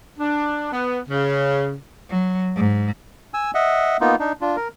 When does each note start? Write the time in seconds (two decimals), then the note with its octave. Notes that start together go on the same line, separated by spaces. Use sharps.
0.19 D4
0.72 B3
1.09 C#3
2.10 F#3
2.56 G#2
3.34 G#5 E6
3.54 D#5 E5 F#5
4.01 A#3 B3 D#4 F4
4.19 D4 D#4
4.41 D4 F4
4.57 A#4